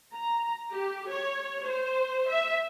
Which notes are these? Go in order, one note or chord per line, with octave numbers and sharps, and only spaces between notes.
A#5
G4
C#5
C5
E5